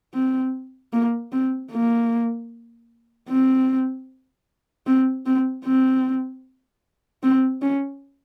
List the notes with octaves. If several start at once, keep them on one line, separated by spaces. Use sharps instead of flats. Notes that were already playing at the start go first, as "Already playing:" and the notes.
C4
A#3
C4
A#3
C4
C4
C4
C4
C4
C#4